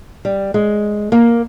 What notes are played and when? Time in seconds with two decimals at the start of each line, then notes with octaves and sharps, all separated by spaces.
0.25 G3
0.54 G#3
1.12 A#3